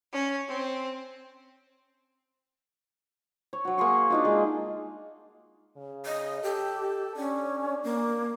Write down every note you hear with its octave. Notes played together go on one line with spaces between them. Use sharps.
C#4
C4
C#5
F#3 F#4
A#3 G#4 C6 C#6
D4 D#4 F4
G#3
C#3
D#5
G4 A4
C#4 D4
A#3